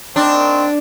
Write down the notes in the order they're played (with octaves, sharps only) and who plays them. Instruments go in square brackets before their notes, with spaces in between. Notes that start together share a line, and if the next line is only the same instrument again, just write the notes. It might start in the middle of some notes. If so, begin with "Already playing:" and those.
[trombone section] D#3 A#3 C4 [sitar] D4